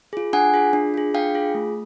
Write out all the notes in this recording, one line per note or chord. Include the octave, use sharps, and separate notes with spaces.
F4 G#4
D4 F#5 G#5
F4 G#4
D4
F4 G#4
D4 F5 G5
F4 G#4
A3